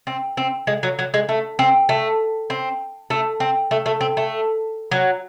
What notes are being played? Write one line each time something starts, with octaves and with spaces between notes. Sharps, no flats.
C4
C4
G#3
F#3
F#3
G#3
A3
C4
A3
C4
A3
C4
A3
A3
C4
A3
F#3